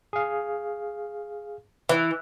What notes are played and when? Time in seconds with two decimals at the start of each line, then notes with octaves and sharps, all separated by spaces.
0.13 G#4 F5
1.89 E3